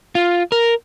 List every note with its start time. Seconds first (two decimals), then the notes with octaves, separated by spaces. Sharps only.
0.15 F4
0.52 A#4